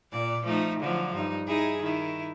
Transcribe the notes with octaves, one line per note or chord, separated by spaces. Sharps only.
A#2 D5
F3 A3 D#4
D3 F3 F#3
G2 D#4
D#4 E4 G#4
D#3 E4